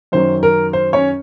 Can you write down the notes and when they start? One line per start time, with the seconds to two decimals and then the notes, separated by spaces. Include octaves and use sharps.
0.12 F#2 D#3 F#3 C5
0.43 A#4
0.73 C5
0.93 C#4 C#5